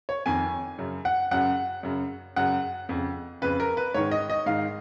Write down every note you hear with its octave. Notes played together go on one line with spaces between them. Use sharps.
C#5
F2 D#3 G#5
F#2 C#3
F#5
F#2 C#3 F#5
F#2 C#3
F#2 C#3 F#5
F2 C#3
F2 C#3 B4
A#4
B4
G#2 D#3 C#5
D#5
D#5
G#2 D#3 F5